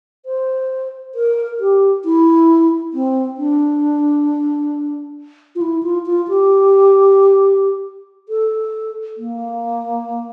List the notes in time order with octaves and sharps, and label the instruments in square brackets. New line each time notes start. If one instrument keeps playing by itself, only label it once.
[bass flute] C5
A#4
G4
E4
C4
D4
F4
E4
F4
F4
G4
A4
A#3